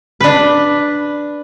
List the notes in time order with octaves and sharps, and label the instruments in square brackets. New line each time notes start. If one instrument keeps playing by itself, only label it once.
[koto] D4 B4